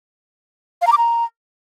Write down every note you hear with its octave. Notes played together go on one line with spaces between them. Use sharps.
F5
A#5
D6
A#5